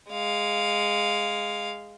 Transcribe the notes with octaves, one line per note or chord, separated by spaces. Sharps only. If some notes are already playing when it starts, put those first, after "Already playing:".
G#3 F5